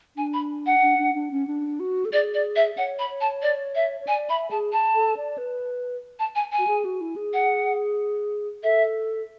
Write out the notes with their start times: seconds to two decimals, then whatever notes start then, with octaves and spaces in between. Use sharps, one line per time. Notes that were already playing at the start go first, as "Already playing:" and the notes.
0.17 D4 G#5
0.33 B5
0.66 F#5
0.82 D4
0.98 D4
1.15 D4
1.31 C#4
1.47 D4
1.80 F#4
2.05 A4
2.12 G#4 D5
2.34 D5
2.56 E5
2.77 C#5 F#5
2.99 B5
3.10 C#5
3.21 A5
3.42 D5
3.75 E5
4.00 C#5
4.07 D5 G#5
4.29 E5 B5
4.51 G#4 A5
4.72 A5
4.95 A4
5.17 D5
5.38 B4
6.19 A5
6.35 G#5
6.52 G#5
6.58 F#4
6.67 G#4
6.85 F#4
7.01 E4
7.16 G#4
7.33 F#5
8.63 A4 E5